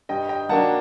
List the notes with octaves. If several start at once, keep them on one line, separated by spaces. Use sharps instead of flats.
G2 D#5 G5
D#5 G5
F#3 A#3 D4 F#5 A5